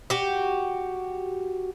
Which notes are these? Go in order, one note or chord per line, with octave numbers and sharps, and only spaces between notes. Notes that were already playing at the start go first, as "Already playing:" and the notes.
F#4 G4